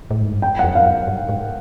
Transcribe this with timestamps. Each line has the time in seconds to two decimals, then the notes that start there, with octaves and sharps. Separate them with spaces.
0.11 A2
0.21 G#2
0.32 G2
0.42 F#2 G5
0.59 F2 F#5
0.75 F5
0.86 F#2
1.08 G2
1.29 G#2